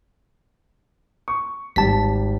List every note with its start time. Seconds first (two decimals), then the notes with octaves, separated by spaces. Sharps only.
1.28 C#6
1.76 G#1 G3 A5 B6